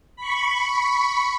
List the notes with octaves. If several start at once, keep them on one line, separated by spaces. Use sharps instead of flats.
B5 C#6